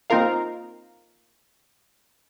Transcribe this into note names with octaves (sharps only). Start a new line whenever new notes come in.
A#3 C4 D#4 F4 A#4 F5